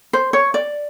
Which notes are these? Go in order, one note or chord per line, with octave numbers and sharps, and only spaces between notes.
C5
C#5
D5